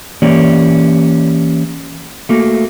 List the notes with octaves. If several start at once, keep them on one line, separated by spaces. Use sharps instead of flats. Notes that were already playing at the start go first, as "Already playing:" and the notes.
E3 A#3 C#4 G4 D5
A3 A#3 F#4